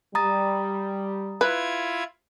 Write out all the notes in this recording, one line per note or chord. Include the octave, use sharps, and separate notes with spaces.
G3 A#5 D#6 A6
E4 F4 B4 G#6